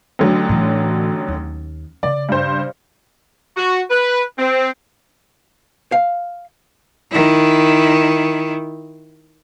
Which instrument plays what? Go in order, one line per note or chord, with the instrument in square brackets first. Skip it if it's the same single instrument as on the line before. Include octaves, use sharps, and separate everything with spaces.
[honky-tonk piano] A1 D3 F#3
[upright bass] A2 E3
D#2
[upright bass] C#3 [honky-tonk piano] D5
[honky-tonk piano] G2 C5
[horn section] F#4
B4
C4
[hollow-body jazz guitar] F5
[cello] D#3 E4